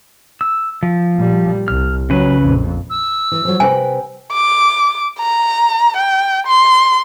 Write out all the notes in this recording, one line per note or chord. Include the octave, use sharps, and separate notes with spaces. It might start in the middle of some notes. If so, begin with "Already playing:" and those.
E6
F3
A#2 G3
C2 F6
C#3 F#3 B4
A#1 F2
E6
E3
F3 F#3
C3 B4 G5 G#5
D6
A#5
G5
C6